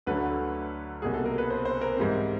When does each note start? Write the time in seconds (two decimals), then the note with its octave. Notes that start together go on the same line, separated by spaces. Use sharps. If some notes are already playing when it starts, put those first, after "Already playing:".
0.07 D2 D3 F#3 A3 B4
1.02 C2 B2 F#3 A#3 G#4
1.14 A4
1.26 A#4
1.38 B4
1.50 C5
1.65 C5
1.81 A#4
1.97 G#2 E3 G3 C4